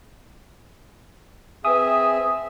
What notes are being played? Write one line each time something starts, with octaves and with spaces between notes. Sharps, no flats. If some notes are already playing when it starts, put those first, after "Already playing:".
C4 G#4 B4 E5 G#5 D#6